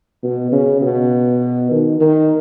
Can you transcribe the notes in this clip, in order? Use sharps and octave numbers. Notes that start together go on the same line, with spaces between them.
B2
C#3
B2
D#3
D#3